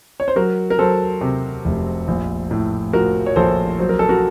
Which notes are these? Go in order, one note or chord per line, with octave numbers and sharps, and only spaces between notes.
C#5
C5
F#3 F#4 A#4
A#4
F#3 A4 C5
C3
F1
A#1
A2
F3 F#4 A#4
C#5
A#1 A4 C5
F#3 C5
A#4
A4
F#4 A#4